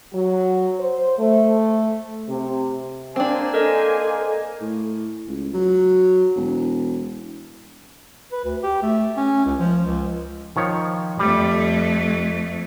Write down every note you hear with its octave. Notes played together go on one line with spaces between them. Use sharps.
F#3
C5
A3
C3
A#3 C4 D4 C5 G#5
A4 A#4 D#5
A2
C#2
F#3
E1
B4
D2
G4
A3
C#4
C#2
F3
C#2
D#3 F3 C#5
F2 G3 A3